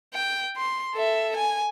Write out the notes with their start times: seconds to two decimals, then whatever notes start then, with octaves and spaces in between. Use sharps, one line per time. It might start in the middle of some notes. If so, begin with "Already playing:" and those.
0.14 G5
0.57 C6
0.94 A4 E5
1.37 G#5